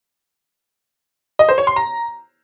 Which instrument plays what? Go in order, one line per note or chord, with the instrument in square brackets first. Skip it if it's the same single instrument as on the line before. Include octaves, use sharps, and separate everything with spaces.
[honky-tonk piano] D#5
C5
C#5
C6
A#5